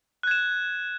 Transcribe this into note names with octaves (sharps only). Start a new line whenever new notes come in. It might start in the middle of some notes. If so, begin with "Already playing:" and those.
F#6 G#6 E7